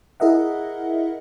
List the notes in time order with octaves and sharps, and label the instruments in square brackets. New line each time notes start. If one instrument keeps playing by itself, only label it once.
[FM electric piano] E4 G#4 A#4 D#5 E5 F#5